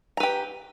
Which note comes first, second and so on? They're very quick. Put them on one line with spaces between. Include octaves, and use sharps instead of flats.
A#5 B4 G4